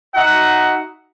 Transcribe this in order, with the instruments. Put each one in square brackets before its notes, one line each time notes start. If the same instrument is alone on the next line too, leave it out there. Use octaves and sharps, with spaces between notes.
[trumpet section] D#4 F#4 E5 F#5